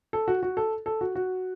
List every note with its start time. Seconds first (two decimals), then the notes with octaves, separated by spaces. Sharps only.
0.13 A4
0.28 F#4
0.43 F#4
0.57 A4
0.86 A4
1.01 F#4
1.15 F#4